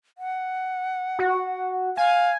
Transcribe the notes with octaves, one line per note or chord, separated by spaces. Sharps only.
F#5
F#4
F5 G#5